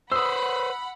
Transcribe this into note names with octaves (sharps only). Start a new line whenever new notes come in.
B4 C5 F#5 B5 D#6 E6